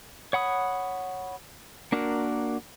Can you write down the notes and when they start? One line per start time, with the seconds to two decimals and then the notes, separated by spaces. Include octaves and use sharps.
0.33 C#5 F#5 B5 D#6
1.92 A#3 D4 F#4 A#4